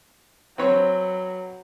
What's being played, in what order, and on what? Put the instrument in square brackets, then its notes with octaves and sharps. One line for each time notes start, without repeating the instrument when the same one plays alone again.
[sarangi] F#3 [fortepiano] C4 B4 C#5